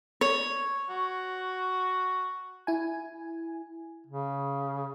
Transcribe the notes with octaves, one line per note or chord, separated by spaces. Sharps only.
C#5
F#4
E4 G#5
C#3